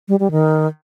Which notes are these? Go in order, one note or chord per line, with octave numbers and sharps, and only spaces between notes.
G3
G3
D#3